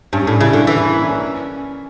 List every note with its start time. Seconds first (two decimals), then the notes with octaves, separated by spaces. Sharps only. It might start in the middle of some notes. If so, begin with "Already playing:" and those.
0.13 G2 C#4
0.27 A2 D4
0.41 C#3 E4
0.53 D3 D4
0.67 E3 D4
0.82 C#4
0.95 A#3
1.08 C#4
1.22 C#4